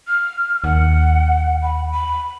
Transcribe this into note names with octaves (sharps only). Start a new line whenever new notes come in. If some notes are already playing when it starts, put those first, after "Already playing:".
F6
D#2 F#5
B5
B5